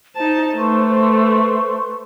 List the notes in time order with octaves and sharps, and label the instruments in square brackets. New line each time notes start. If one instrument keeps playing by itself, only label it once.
[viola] D#4 A5 [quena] C5
[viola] A3 [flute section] B4 C6 C#6